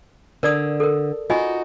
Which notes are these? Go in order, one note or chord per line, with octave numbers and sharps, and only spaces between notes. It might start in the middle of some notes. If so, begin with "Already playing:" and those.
D3 A#4 D5 D#6
A4 A#4
D#4 F4 F#4 D#5 G#5